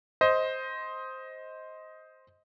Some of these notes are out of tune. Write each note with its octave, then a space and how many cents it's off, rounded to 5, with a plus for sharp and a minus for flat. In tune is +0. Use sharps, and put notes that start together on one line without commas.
C5 +0 D#5 +15